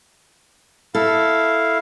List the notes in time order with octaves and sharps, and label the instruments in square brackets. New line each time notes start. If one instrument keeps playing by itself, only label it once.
[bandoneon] E4 F5 [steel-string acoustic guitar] A4